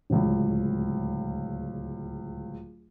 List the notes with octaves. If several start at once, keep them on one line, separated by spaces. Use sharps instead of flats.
D1 C#2